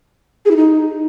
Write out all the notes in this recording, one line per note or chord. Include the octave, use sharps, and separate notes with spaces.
G#4
E4
D#4